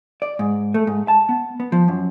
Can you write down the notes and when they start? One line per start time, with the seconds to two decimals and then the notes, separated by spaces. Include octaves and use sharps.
0.22 D5
0.39 G#2
0.74 A3
0.87 G#2
1.08 A5
1.29 B3
1.60 B3
1.72 F3
1.88 F#2